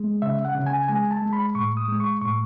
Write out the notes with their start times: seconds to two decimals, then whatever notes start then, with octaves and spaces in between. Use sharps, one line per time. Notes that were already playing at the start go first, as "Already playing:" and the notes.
Already playing: G#3
0.22 C#3 E5
0.45 F#5
0.55 C#3
0.66 G#5
0.88 G#3 G#5
1.11 A5
1.22 G#3
1.33 B5
1.55 A2 C#6
1.77 D#6
1.88 G#3
2.00 C#6
2.21 A2 C#6